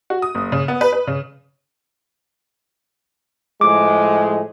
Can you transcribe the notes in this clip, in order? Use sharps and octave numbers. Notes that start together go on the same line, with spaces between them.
F#4
D#6
F#1
C#3
B3
B4
B4
C#3
A2 F3 G#3 D6